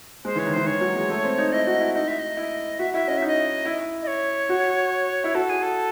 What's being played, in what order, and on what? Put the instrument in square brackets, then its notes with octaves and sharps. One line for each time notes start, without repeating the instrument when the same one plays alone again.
[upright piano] G#3 [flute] C5
[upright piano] E3 [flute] C#5
[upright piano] D#3
[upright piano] E3 [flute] C5
[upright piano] E3 [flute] C#5
[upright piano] F#3
G#3
A3
C4
D#4
[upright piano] E4 [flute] D#5
[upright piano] F#4
E4
[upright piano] D#4 [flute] D#5
[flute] E5
D#5
[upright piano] E4
[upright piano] F#4 [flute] E5
[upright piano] E4 [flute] E5
[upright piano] C#4 [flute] D#5
[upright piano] D#4 [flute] E5
[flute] D#5
[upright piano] E4
[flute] D#5
C#5
[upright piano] F#4
E4
[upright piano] F#4 [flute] A4
[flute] G#4
A4